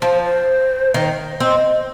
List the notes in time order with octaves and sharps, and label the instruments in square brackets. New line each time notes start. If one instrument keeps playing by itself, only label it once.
[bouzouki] F3 [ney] C5
[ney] C5
[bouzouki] D#3
[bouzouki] C4 [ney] D#5